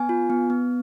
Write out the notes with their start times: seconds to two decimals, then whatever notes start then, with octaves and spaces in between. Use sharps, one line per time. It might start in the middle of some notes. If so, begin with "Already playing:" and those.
Already playing: B3 G#5
0.09 F4
0.30 B3
0.50 B3